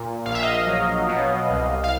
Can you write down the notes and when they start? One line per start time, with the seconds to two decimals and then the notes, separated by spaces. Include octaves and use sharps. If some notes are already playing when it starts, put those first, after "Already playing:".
Already playing: A#2
0.26 A#1 F5
0.35 E5
0.43 D#5 F5
0.67 F#3
1.08 B2
1.50 C2
1.84 F5